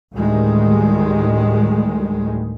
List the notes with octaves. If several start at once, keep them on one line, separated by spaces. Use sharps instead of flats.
D2 A2 D#3 G3 G#3